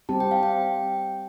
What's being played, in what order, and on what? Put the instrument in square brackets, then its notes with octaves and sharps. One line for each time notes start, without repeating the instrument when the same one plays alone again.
[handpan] G3 C4 G4 [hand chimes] A5
[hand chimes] G5
F5
G5